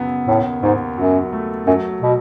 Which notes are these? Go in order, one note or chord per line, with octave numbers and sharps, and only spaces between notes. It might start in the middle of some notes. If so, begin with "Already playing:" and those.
Already playing: F#2 C#3 F#3 B3
D#2 A2
D#2 G#2
F#2 F#3
A3
F#2 F#3
B2